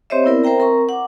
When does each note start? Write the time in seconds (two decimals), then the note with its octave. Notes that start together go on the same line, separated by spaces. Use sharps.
0.10 C4 G4 C5 C#5 D#5 E5
0.24 B3 C4 E4 A#4 D5
0.44 A#4 C5 E5 G5 A#5
0.59 C4 A#4 A#5 C#6
0.89 F#5 D6